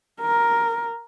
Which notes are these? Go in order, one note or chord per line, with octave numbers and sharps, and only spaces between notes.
A#4